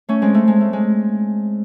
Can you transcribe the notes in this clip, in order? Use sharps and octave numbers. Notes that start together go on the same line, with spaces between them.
A3 C#4
G#3 C4
A3
G#3
A3
G#3